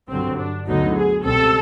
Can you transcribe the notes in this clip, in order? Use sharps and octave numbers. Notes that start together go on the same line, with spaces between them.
G2 D3 F#3 C4
D4
D2 D3 F#3 B3 D#4
G#4
C#2 B2 G3 C4 A4